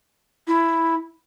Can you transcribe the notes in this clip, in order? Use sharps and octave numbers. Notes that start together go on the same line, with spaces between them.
E4